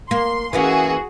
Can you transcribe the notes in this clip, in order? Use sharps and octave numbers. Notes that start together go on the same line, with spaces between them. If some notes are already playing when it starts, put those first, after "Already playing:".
A#3 C6
E3 A#3 C#4 F#4 G#4